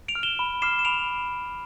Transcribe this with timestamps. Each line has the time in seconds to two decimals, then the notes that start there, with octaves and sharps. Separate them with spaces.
0.08 D7 F7
0.15 F6
0.23 E7 G7
0.39 B5
0.62 D6 F6 C7 E7
0.79 E7
0.85 B5 D7 F7